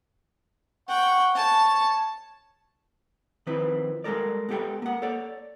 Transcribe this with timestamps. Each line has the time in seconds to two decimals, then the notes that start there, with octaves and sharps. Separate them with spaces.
0.89 F#5 G5 C#6
1.35 C#5 A5
3.47 D#3 F3 C4 E4 B4
4.04 G3 G#3 A#3 A4 A#4 D5
4.49 G#3 B3 G4 A4 G5
4.82 A#3 F#5
5.02 A4 C#5 D5